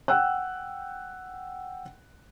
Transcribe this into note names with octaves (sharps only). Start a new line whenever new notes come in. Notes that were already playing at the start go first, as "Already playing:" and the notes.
F#5 G5 E6 F#6